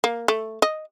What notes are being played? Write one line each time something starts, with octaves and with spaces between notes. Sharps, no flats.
A#3
A3
D#5